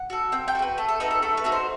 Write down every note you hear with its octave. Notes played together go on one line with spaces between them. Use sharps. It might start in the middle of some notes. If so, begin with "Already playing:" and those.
Already playing: F#5
F#4 A4
C4 G5
G5
F#4 A4
B4
A3 A4
A4
D#4 F#4 A4 B4
A4
A3 A4
B4
D#4 F#4 A4
C5